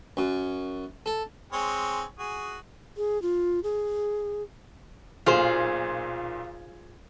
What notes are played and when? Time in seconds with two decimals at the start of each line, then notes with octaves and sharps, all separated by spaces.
0.17 F#2
1.06 A4
1.53 G#3 C4 C#5
2.19 F#4 G#4
2.97 G#4
3.22 F4
3.63 G#4
5.26 B1 A#2 F4 G#4 C5